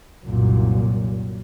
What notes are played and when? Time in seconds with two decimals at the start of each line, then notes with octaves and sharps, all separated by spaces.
0.24 C2 F#2 A#2